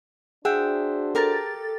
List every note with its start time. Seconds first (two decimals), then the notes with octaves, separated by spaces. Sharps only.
0.45 D4 F#4 G#4 C5 E5 F#5 G5
1.15 G4 A4 A#4 A#5 A6